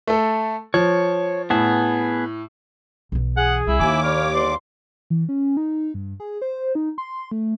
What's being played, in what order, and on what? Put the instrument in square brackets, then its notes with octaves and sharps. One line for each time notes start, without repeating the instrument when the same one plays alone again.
[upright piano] A3 A4
[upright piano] F3 [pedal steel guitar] C#5
[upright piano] A2 [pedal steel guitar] B3 G#4 A5
[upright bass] B1 E3
[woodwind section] G#4 [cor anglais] F#5
[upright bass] C2 [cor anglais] E4
[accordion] D#2 D6 [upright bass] D#3 [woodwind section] G#5
[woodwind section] D4 B5 F6 [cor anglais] C#5
[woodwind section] E2 G2 C6 [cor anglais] D5
[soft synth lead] E3
C#4
D#4
G2
G#4
C5
D#4
C6
A3